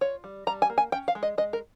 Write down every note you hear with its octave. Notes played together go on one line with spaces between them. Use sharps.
F4 C#5
G3
G3 A#5
G#5
A#3
G#5
C#4 G5
F5
G#3
D#5
G#3 D#5
A#4